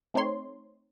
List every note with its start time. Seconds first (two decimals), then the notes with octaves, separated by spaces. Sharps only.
0.14 A3 C4 D#4 C#5 C6